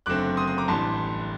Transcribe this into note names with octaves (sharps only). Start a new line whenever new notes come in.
F#1 F#2 D3 A3 C4 D6 F#6
C6 D#6
C6 D#6
A#5 D6
A1 A2 G3 D4 A5 C6